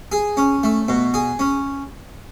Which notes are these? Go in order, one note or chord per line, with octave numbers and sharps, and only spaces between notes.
G#4
C#4
A3
B2
G#4
C#4